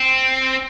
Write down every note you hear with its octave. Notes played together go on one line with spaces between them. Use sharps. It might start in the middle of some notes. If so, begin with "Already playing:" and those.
Already playing: C4